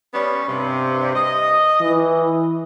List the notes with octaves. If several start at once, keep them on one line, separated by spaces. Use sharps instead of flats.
G3 B3 C#4
G2 C3
D#5
E3